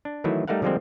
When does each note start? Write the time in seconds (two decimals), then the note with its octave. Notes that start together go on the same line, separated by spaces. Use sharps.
0.05 D4
0.24 D#3 E3 F#3 A3 E4
0.48 G3 A3 D#4 A#4 F5 F#5
0.62 D3 F3 G3 G#3 A#3 C4